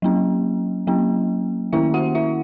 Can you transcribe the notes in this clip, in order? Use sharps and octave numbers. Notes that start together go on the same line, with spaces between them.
F#3 A#3 C#4
F#3 A#3 C#4
D#3 A#3 C#4 E4 E5
F#4 F#5
E4 E5